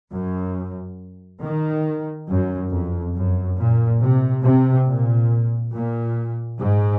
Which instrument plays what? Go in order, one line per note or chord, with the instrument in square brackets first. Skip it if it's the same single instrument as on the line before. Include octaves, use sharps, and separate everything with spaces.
[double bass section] F#2
D#3
F#2
F2
F#2
A#2
C3
C3
A#2
A#2
G#2